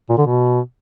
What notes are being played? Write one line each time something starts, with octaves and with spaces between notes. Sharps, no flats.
A#2
D3
B2